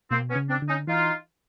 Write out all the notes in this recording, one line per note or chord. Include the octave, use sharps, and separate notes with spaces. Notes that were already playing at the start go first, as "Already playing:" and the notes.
B2 A#3 C4
B3 C#4
C#3
C4 D4
D3
C#4 D#4
E3 D#4 F4